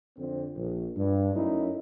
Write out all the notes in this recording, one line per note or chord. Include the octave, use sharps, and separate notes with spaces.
F2 D3 C4
A#1
G2
F#2 A3 C#4 D#4 E4